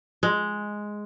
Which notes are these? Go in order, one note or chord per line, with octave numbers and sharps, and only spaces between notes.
G#3